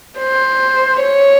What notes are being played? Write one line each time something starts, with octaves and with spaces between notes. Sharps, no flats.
C5
C#5